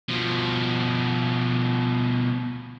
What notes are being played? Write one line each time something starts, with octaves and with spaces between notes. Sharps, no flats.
B2 F3